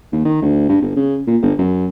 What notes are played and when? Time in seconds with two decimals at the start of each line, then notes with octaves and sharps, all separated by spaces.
0.12 D#2
0.25 D#3
0.42 D2
0.69 G2
0.82 G1
0.96 C#3
1.27 A#2
1.42 G1
1.58 F#2